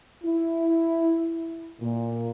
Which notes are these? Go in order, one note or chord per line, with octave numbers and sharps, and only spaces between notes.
E4
A#2